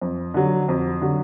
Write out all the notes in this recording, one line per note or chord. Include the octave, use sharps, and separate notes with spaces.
F2
D3 F#3
F2
D3 F#3